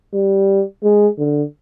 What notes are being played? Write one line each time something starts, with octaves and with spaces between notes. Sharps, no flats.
G3
G#3
D3